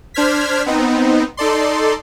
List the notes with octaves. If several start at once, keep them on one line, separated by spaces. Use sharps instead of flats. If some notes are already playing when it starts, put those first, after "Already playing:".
D4 C5 F6 G#6 B6
B3 C4 D#4
D#4 A4 D5 C6